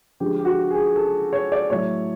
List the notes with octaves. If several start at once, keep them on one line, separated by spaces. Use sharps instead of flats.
D3 F3 G#3 G4
G4
F#4
G#4
A4
C#5
D5
A2 F#3 A3 C#5